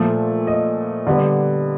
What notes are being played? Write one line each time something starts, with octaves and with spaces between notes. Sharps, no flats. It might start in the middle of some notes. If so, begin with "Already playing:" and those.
Already playing: A#2 F3 A3
D#5
D3 G3 B3